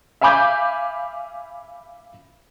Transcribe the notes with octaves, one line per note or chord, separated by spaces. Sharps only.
E5 F5 G#5 B5 D6 G6